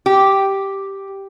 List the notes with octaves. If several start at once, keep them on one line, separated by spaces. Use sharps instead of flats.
G4